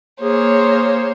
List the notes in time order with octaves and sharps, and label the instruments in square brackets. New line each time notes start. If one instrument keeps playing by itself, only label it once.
[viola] A#3 G#4 [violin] C5 C#5